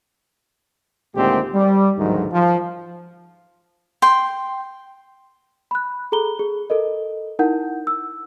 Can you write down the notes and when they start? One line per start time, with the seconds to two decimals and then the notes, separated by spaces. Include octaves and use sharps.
1.16 D2 A#2 D#3 G#3 C4 G4
1.54 G3
1.97 A1 D2 G#2 D#3 F#3
2.32 F3
4.02 G5 C6
5.71 B5 F#6
6.12 G#4 A4 A#5 B5 G7
6.39 G#4
6.70 A4 A#4 D#5
7.39 D#4 E4 A#4 F#5 G6
7.87 E6